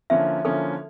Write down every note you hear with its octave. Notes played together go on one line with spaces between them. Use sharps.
D3 F3 A#3 C#4 E4 E5
D3 F3 A#3 C#4 E4 A4